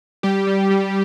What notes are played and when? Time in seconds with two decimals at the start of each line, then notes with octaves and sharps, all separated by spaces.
0.23 G3 G4
0.47 G3
0.71 G3